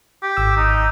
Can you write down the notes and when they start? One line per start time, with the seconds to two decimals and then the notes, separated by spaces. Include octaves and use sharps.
0.23 G4
0.37 G#1 E6
0.57 D#4